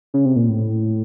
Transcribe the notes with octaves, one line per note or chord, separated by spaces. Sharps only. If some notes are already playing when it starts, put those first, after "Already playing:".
C#3
C3
A#2
A2